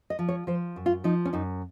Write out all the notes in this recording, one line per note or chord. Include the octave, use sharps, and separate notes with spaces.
D#5
F3
C#5
F3 C5
F#2
F4
F3 D#4
C#4
F#2 D#4